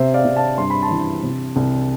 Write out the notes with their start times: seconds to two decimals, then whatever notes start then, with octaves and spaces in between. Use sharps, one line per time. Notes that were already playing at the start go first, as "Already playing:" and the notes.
Already playing: C3 C5 E5
0.14 D5 F5
0.25 C3
0.36 F5 A5
0.58 G2 C6
0.70 B5
0.82 A5 C6
0.91 E3
1.23 C3
1.56 C2